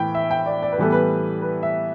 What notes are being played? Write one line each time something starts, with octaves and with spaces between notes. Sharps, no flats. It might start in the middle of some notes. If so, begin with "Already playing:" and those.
Already playing: A2 E3 G5 B5
E5
G5
D5
D5
B4
A2 E3 G3 B3 A4
B4
B4
E5